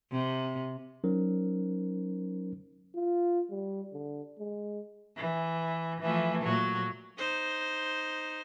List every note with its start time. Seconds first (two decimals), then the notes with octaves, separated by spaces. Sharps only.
0.11 C3
1.04 F#3 C#4 D#4 A#4 C5
2.95 F4
3.50 G3
3.94 D3
4.39 G#3
5.16 E3
6.01 E3 F3 A3
6.41 A#2 F#3
7.17 D#4 C5